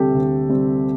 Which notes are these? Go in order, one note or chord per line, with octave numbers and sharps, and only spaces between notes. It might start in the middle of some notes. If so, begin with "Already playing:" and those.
Already playing: D2 C3 G3 C4 G4 A4
D2
C3 G3 C4